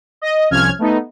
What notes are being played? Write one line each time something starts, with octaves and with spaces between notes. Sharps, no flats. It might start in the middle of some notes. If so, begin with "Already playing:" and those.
D#5
C2 F3 C#4 F6 G#6
A3 B3 D#4